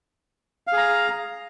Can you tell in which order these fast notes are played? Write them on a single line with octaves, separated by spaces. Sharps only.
F5 G#4 A#5